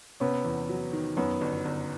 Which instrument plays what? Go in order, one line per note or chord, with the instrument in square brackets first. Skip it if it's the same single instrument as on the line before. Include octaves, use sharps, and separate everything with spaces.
[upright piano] C3 [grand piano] B3 C#4
[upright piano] E2
F#3
D#3
[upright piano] F#2 [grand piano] B3 C#4
[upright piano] G1
G1